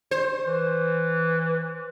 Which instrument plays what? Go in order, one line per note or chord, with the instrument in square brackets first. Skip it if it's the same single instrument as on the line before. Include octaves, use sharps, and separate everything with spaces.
[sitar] C5
[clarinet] E3